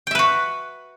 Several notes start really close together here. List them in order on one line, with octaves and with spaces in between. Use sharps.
G5 E5 B4 F#4